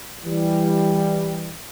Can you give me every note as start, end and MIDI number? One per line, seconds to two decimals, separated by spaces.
0.25 1.54 52
0.25 1.54 55